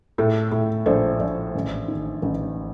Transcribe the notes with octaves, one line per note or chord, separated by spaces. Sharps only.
A2 A4
A2
A#1 A4 C5
A#1
A1
D#3
A1